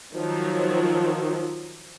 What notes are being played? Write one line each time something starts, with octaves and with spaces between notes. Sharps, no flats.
D#3 F3 F#3